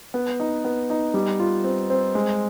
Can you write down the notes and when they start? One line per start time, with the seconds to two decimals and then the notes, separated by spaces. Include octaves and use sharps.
0.14 B3
0.40 D#4
0.65 B3
0.90 D#4
1.14 G3
1.39 F4
1.64 C4
1.90 C4
2.15 G#3